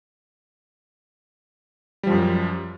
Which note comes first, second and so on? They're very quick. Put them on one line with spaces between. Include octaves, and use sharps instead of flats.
G3 F3 F#2